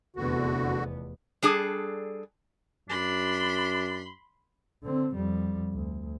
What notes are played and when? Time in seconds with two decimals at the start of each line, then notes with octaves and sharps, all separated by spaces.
0.16 F1 E2 D3 B3 F#4
1.42 G3 D4 G#4 A4
2.90 F#2 D4 B5 C6
4.83 D3 C4
5.15 F2 G3
5.73 D2